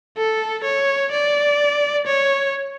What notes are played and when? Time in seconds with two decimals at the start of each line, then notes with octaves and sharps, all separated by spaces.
0.17 A4
0.64 C#5
1.11 D5
2.07 C#5